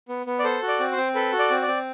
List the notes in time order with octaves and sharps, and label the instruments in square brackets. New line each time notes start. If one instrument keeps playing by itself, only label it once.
[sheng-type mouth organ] B3
B3
D5
A4 C5
F#4
D5
C4
C5
C4
A4 B4
F#4
D5
C4
D5
C4